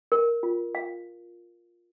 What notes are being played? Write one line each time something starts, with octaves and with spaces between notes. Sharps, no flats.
A#4
F4
F5